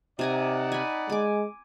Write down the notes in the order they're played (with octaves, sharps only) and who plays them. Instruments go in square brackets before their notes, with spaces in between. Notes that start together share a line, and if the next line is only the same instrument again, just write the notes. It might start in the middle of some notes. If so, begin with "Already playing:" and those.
[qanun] C3 G#5 A#5 [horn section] D#4 D5 F#5
[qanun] G#5 B5
[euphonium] G#3 [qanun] G#5 D6